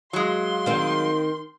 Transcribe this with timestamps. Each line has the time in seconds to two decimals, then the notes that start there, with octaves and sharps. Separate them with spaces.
0.13 F#3 G#3 F5 C6
0.66 D#3 C4